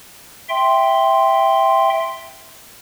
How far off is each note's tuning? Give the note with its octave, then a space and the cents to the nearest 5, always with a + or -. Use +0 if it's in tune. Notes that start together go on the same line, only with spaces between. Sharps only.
E5 +0 G5 +0 C6 +0